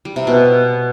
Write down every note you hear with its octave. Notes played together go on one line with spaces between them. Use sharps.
G3
C3
B2